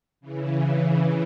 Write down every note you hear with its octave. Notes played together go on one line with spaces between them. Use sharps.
C#3 E3